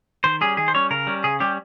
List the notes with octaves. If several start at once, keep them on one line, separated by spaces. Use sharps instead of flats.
D#3 C5
G3 C#4 G#4
D#3 G#4
C5
G3 C#4 C#5
C#3 A#4
G3 C#4
C#3 G#4
G3 C#4 G4